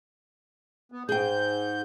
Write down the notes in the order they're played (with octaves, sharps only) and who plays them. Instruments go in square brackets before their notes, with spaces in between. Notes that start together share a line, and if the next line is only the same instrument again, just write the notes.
[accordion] B3
[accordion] G#2 G6 [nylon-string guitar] G#4 G5